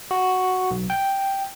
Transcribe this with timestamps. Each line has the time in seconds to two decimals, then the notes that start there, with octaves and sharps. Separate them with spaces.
0.11 F#4
0.71 B1
0.90 G5